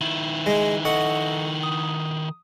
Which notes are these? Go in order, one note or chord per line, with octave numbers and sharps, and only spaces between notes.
D#3 E4
G#3
A4 D#5 F#5 C#6
D#6